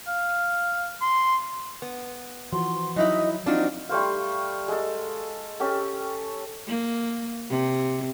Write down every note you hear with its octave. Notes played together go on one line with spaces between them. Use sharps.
F5
C6
B3
E3 F3 F#4 C6
E3 F#3 D#4 E4 D#5 E5
C4 D4 D#4 F4 F#4
G3 A3 C5 F5
G#3 A4
C#4 G4 A4
A#3
C3